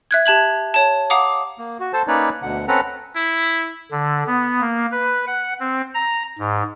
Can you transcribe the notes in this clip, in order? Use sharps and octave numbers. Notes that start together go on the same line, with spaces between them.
E5 F#6 G#6
G4 A5 G#6 F#7
C#5 A5
F5 F#5 A#5 D6 D#6
A#3
F#4
A4 C5 A5
A#3 C#4 D#4 B4 C#5 D5
D2 B2 D3 F#5
C4 C#4 A4 B4 F#5 A#5
E4
D3
B3
A#3
B4
F#5
C4
A#5
G#2